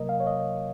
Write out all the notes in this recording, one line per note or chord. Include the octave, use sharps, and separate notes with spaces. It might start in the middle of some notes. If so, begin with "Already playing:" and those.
Already playing: C3 F#3 A#3 A#4 D#5
F5
C#5
D#5